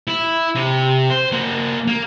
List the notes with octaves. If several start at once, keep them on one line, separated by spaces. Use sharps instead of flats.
E4
C3
C5
A#3 F#4
A#3